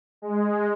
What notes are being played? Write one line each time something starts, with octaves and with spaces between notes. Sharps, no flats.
G#3